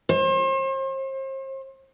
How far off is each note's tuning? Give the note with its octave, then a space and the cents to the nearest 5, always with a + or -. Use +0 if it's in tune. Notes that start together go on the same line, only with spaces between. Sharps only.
C5 +40